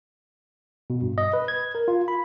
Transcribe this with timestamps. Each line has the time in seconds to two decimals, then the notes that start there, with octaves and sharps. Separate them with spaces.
0.90 B2
1.02 G2
1.18 D#5
1.33 B4
1.48 G#6
1.75 A#4
1.88 F4
2.08 B5